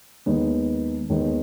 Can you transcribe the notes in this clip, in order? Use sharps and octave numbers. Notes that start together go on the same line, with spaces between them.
D#2 D#3 G#3 B3 D#4
D#2 D#3 G#3 B3 D#4